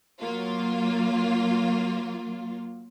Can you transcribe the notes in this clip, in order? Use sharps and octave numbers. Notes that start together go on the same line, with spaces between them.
F#3 A#3 F4